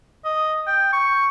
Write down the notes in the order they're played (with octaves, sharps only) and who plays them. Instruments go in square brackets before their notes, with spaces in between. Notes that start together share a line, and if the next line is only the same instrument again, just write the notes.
[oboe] D#5
G5
C#6